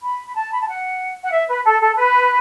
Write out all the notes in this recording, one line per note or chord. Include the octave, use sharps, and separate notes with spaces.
B5
B5
A5
B5
A5
F#5
F#5
E5
B4
A4
A4
B4